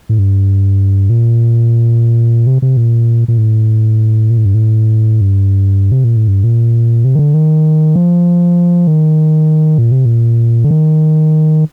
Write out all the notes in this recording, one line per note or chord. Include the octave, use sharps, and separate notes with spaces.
A2
G2
A#2
C3
C3
A#2
A#2
A2
A#2
A2
G2
A2
G2
C3
A#2
A2
G2
A#2
C3
D#3
D3
D#3
F3
D#3
A#2
C3
A#2
D3
D#3